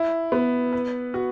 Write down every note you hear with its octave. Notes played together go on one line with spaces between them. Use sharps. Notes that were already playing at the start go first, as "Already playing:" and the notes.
Already playing: E4
B3
B4
F#4